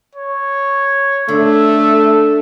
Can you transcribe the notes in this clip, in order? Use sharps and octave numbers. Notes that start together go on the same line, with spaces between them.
C#5
D3 A3 E6